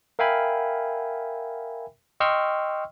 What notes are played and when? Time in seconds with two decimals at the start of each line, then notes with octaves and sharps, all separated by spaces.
0.19 A#4 E5 F5 G5 G#5 B5
2.20 D#5 G5 C6 C#6 E6 F6